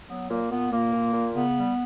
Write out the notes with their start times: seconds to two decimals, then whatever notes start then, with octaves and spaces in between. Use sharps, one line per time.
0.09 F#3 B3
0.30 A#2 A#3
0.51 A#2 B3
0.72 A#2 A#3
0.93 A#2
1.14 A#2
1.35 C#3 B3
1.57 G3